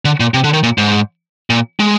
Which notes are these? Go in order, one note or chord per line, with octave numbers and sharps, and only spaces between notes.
D3
A#2
C3
D3
D#3
A#2
G#2
A#2
G#3